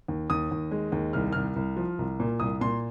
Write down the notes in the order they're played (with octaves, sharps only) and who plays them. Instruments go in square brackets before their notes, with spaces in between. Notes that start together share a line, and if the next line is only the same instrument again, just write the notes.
[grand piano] D#2
D#2 D#6
D#2
G#3
D#2
C2 F6
C2 F6
C2
F3
C2
A#2
C2 D#6
A#2 C6